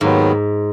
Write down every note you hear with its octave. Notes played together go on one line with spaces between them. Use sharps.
D#2 G#2 D#3 F#3 B3